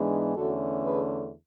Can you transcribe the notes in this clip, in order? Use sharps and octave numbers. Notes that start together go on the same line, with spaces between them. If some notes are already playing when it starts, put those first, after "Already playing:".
Already playing: G#2 E3 G#3 B3 D4
E2 D3 A3 C#4 F#4 A4
G#4 B4